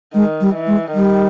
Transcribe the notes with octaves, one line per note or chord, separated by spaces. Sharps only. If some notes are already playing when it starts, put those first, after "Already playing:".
D#3 G#3
G3
E3
G#3
D#3 G3